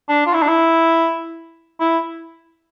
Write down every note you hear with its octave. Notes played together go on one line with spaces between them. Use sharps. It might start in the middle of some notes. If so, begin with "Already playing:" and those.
D4
F4
E4
D4
E4
E4